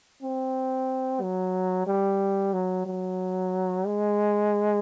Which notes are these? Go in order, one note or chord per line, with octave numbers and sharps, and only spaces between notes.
C4
F#3
G3
F#3
F#3
G#3